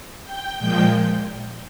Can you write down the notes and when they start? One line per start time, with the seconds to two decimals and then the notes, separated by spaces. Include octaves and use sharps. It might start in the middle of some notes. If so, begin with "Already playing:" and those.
0.24 G5 G6
0.59 A#2 F3 G#3 G5 G6